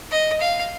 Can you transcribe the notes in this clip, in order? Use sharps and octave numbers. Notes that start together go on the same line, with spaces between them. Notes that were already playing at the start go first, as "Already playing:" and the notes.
D#5
F5